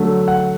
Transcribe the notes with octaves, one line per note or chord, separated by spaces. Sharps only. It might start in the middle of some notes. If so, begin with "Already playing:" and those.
Already playing: D3 F#3 A3
F#5